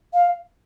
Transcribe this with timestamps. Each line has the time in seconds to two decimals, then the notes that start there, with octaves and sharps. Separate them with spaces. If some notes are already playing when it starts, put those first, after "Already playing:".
0.13 F5